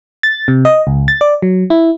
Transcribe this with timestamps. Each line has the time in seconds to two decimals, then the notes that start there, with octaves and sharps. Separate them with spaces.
0.23 A6
0.48 C3
0.65 D#5
0.87 C#2
1.08 A6
1.21 D5
1.42 F#3
1.70 E4